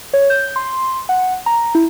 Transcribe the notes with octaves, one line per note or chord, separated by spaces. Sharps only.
C#5
G6
C6
F#5
A#5
E4